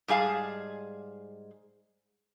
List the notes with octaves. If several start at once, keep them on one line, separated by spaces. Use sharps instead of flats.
G#2 G3 G#4 F5 A5